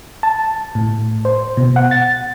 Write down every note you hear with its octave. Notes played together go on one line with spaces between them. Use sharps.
A5
A2
C5
B2
F#5
A6